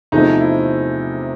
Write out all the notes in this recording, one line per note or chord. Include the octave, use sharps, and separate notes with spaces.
E2 C3 F3 A3 D#4
E4